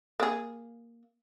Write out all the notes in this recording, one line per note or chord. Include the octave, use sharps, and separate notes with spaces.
A#3 G#4